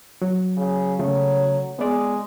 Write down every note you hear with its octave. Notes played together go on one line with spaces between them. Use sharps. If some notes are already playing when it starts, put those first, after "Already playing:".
F#3
C#3
C#3 F#3 A3
G#3 B3 D5